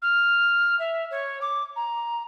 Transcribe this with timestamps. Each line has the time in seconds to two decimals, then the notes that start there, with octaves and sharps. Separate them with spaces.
0.02 F6
0.79 E5
1.11 C#5
1.41 D6
1.76 A#5